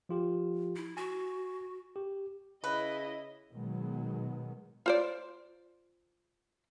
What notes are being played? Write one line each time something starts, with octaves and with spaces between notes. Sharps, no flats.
F3 F4 G4
E4
F#4 G#5
G4
C#3 E4 B4 D#5
B2 D#3 F#3 G#3 B3
F4 C5 D5